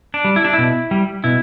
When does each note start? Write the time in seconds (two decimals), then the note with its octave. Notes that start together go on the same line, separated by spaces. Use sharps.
0.14 D4
0.24 G3
0.36 E4
0.45 D4
0.53 B2 E4
0.91 G3
1.24 B2 E4